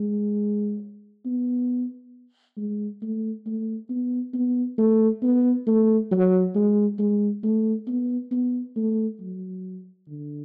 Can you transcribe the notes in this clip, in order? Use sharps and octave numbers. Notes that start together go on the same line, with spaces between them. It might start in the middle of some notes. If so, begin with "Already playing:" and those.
Already playing: G#3
B3
G#3
A3
A3
B3
B3
A3
B3
A3
F#3
G#3
G#3
A3
B3
B3
A3
F#3
D3